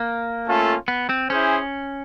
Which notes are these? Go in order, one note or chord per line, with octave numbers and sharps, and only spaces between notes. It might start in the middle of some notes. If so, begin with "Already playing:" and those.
Already playing: A#3
A3 C#4 F4 A4
B3
C4
C#4 E4 G#4 C5